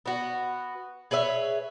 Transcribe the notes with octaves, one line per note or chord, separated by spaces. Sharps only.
B3 F#4
G#4 B4 C#5 E5